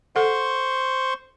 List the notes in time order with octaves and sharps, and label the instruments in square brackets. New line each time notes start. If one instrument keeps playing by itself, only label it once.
[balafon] A4 F#5 [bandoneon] C5 C6 C#6